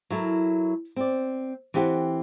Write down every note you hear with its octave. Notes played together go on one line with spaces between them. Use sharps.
F#3 E4 A4 A#4
C4 D5
E3 C4 G4 A4 D5 F#5